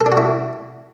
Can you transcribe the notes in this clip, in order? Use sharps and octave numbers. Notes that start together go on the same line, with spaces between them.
A4
D4
F#4
E4